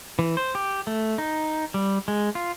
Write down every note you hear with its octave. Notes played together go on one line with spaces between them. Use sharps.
E3
C5
G4
A3
D#4
G3
G#3
F4